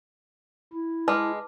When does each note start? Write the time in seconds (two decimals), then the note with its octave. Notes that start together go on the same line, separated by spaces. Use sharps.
0.73 E4
1.08 G#3 B4 A5 D6